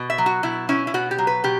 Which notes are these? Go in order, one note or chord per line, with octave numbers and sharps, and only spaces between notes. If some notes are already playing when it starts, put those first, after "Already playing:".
Already playing: B2
E5
F#3
F#4
B2 E4
C#4 E4
E4
B2 F#4
G4
F#3
B4
B2 G4